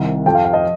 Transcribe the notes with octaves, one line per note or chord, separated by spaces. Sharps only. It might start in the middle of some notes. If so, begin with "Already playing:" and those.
Already playing: C2 C3 D#3
F2 F3 G5
F5
F5
D#5